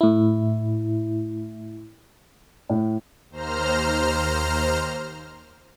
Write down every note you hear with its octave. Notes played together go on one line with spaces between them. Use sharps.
A2 E4
A2
D#2 C5 A#5 F6